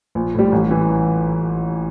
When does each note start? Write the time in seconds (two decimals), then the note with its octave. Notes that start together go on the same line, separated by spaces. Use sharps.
0.15 A#1
0.34 A2 G3
0.52 A1
0.71 E3